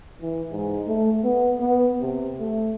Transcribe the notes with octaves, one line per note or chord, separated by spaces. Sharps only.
E3
G#2
A3
B3
B3
C3
A3